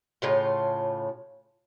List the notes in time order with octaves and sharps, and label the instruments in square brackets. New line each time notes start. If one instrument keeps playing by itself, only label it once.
[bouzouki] A2 C#3 F4